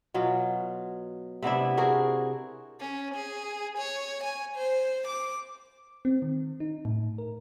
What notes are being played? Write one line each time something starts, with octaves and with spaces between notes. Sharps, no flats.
B2 F#3 F4
C3 B3 D4 E4
F#4 G#4 A#4 C5
C#4
G#4
C#5
G#5
C5
D6
C4
D#3
D#4
A2
A#4